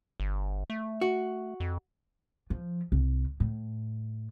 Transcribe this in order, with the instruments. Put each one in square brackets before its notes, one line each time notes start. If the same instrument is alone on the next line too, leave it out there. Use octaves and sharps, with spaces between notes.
[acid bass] G1
A3
[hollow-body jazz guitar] F#4
[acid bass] F2
[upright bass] F3
C2
A2